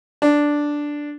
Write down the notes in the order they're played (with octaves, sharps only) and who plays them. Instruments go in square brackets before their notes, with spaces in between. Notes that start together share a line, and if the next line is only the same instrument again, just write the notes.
[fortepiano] D4